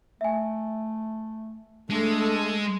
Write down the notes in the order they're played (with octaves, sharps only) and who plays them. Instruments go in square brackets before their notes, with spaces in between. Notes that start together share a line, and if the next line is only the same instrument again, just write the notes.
[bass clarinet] A3 [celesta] E5 G#5
[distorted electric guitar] G#3 [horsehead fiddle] A3 A4 [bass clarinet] D4